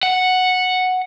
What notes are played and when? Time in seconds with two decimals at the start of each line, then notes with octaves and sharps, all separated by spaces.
0.03 F#5